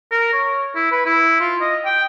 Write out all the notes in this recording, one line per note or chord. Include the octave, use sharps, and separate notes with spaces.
A#4
C#5
E4
B4
E4
F4
D#5
G5